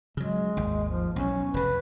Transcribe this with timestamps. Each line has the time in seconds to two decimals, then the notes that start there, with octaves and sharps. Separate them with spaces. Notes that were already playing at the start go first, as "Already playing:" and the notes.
0.17 C#3 F#3 G#3
0.57 G#1 D#2
0.88 F3
1.16 B1 E2 C#4
1.54 F1 C#3 B4